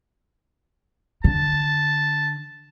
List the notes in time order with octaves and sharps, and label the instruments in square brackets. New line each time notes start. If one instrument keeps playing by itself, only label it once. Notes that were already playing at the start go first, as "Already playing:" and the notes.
[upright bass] D3 [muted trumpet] A5